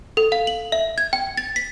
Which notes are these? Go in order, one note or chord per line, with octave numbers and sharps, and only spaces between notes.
A4
F5
F#7
E5
G#6
G5
A6
B6